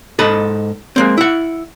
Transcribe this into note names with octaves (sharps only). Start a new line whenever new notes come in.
G#2 A4 D#5 B5
G#3 A#3 C4
E4 F#5